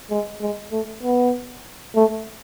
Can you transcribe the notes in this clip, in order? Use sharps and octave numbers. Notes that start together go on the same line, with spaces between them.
G#3
G#3
A3
B3
A3